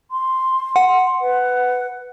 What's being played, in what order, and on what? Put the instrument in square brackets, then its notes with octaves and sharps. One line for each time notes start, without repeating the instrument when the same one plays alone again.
[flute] C6
[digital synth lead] F#5
[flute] B4